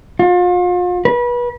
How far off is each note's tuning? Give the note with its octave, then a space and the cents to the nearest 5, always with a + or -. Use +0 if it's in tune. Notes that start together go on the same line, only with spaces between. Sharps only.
F4 +35
B4 -30